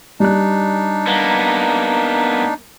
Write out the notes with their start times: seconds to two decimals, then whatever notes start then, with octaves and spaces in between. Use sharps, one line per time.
0.20 G3 D4 D#4 F#6
1.07 A#3 B3